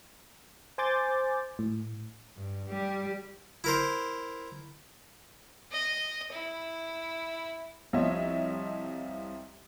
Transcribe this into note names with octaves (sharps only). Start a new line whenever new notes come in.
C5 G#5 C6 D6 G6 A6
A2
G2
G3 G4
E4 A#4 C5
D#5
E4
C2 F3 C#5 D#5 E5